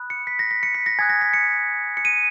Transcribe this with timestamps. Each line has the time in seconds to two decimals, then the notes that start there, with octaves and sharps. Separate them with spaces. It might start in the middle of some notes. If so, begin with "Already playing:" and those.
Already playing: B5 D#6 F#6
0.10 C#7
0.27 B6
0.39 A#6
0.51 B6
0.63 C#7
0.75 B6
0.86 A#6
0.99 G#5 D#6 F#6 G#6
1.09 A#6
1.22 B6
1.34 C#7
1.97 C#7
2.05 D#7